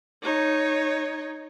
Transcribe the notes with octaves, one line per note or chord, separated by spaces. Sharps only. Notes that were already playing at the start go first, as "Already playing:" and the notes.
D#4 C#5